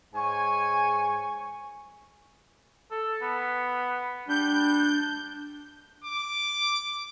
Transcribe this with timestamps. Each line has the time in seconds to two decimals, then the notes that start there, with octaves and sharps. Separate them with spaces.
0.14 G#2 C#5 G#5
2.91 A4
3.21 B3
4.29 G3 D4 G6
6.04 D6